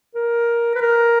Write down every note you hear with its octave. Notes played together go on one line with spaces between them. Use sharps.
A#4
B4
A#4